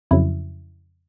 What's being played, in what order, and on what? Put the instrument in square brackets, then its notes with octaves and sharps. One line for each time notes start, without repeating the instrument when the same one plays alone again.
[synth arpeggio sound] F2 C#3 F#3 E4